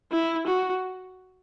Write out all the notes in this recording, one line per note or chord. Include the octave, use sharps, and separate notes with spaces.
E4
F#4